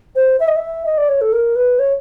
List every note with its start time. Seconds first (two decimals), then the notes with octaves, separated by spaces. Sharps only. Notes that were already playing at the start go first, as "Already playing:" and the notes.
0.16 C5
0.40 E5
0.48 D#5
0.56 E5
0.86 D#5
0.98 D5
1.09 C#5
1.21 A4
1.33 A#4
1.56 B4
1.79 C#5